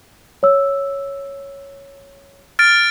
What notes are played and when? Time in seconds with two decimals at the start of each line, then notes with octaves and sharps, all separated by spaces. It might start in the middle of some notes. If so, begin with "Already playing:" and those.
0.43 C#5 E6
2.59 F6 A6 D7